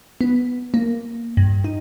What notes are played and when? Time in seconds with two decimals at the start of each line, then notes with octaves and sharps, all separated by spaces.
0.21 B3
0.74 A#3
1.37 G2
1.64 D#4